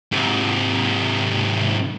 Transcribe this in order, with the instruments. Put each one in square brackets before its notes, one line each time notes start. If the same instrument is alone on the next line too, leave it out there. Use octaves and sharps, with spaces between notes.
[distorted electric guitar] G#2 C3